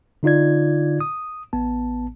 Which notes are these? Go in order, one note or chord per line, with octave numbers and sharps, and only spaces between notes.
D3 D#4 F4 D5 G#6
D#6
A1 B3 A5